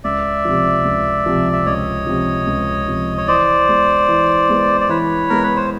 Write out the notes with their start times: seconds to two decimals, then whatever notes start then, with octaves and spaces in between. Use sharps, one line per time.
0.04 C#2 D5 E5
0.45 C3 F3
0.85 C#2
1.26 C3 F3
1.52 E5
1.66 C#2 C#5 D#5
2.07 C3 F3
2.47 C#2
2.87 C3 F3
3.18 C#5
3.27 E3 C5 D5
3.68 G#3 B3
4.08 E3
4.49 G#3 B3
4.81 D5
4.89 E3 B4 C#5
5.30 G#3 B3 A#4
5.43 B4
5.56 C5